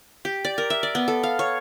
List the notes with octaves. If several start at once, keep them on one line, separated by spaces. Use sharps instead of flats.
G4
D5
A#4
E5
D5
B3
A4
F5
C#5